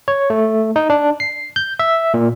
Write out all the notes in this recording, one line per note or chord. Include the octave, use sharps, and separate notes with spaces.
C#5
A3
D#4
D4
C7
G6
E5
A#2